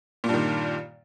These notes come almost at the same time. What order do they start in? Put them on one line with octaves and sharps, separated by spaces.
A#2 G2 D#3